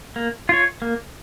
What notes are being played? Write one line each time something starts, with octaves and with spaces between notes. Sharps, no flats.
A#3
F4 C#5
A#3